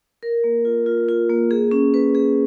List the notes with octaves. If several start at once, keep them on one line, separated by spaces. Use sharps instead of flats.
A#4
A#3
F4
F4
F4
A#3
G#4
C#4
B4
G#4